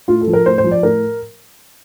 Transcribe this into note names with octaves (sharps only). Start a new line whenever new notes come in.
A2 F4
A4
F3
A#4
A2 C5
C5
F3
D5
A2 A#4